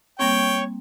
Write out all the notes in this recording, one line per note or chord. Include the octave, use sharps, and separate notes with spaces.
G3 A#3 C4 C#5 G5 C#6